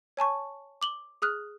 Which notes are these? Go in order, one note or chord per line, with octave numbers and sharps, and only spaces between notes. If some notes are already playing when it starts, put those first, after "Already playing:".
C#5 G#5 A5 C#6
D6 F#7 G7
G#4 D#6 F6 F#6